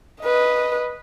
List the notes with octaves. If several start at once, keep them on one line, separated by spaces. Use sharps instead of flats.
B4 D#5